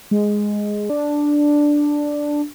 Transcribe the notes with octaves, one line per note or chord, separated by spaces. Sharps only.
G#3
D4